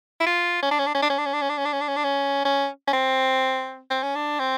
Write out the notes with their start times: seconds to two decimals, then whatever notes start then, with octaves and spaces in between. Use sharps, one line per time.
0.21 E4
0.26 F4
0.63 C#4
0.71 D4
0.79 C#4
0.87 D4
0.95 C#4
1.02 D4
1.10 C#4
1.18 D4
1.26 C#4
1.33 D4
1.42 C#4
1.50 D4
1.58 C#4
1.65 D4
1.73 C#4
1.81 D4
1.88 C#4
1.96 D4
2.04 C#4
2.45 C#4
2.87 C#4
2.93 C4
3.91 C4
4.03 C#4
4.16 D4
4.39 C4